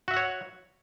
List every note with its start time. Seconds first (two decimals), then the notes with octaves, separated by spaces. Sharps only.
0.08 F#4
0.11 E5
0.14 F#5
0.17 C#5